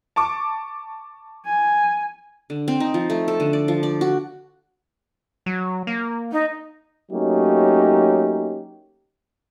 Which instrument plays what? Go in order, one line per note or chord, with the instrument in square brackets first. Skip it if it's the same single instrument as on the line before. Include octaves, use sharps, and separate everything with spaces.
[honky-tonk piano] A5 C#6 D6
[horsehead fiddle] G#5
[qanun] D3
C4
D#4
F3
A3
A4
D3
D5
F3
D5
F#4
[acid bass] F#3
A#3
[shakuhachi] D#4
[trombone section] F#3 A3 A#3 C#4 D#4 G4